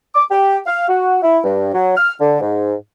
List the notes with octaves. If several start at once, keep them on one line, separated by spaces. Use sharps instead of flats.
D6
G4
F5
F#4
E4
G2
F#3
F6
D3
G#2